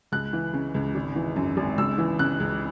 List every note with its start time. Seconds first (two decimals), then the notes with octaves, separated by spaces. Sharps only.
0.12 C#2 F#6
0.33 E3
0.53 C#3
0.74 C#2
0.95 G#1
1.16 E3
1.36 F#2
1.57 G#1
1.78 C#2 E6
1.98 E3
2.19 C#3 F#6
2.40 C#2